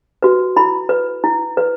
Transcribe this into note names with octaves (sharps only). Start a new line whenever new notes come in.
F#4 B4
E4 B5
B4
E4
B4